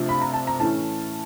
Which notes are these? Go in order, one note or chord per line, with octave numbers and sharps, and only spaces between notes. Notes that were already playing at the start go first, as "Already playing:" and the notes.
Already playing: C3 F3 A3 D4 F4
B5
A#5
A5
A#5
A2 E3 A3 C#4 A5